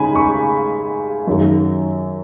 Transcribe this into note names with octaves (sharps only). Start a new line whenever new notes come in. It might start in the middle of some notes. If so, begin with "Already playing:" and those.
Already playing: C#3 G#3 D#4 G#5 B5
C#6
F#2 D#3 F#3